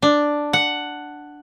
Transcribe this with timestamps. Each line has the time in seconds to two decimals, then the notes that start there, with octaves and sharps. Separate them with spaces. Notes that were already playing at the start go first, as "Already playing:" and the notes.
0.02 D4
0.53 F#5